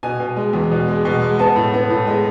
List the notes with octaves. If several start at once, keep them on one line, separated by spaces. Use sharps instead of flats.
B2 G#5
B2
G#3
E2
B2
G#3
B2
G#3
B3 A5
A2
B3
A2
G#3